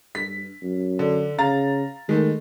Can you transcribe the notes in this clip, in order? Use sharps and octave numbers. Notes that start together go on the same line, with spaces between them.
G2 B6
F#2
D3
C#3 F5 A#5 A6
D#3 G#3 A3